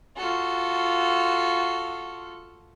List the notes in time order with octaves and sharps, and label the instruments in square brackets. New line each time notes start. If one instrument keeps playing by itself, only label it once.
[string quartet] F4 F#4 A4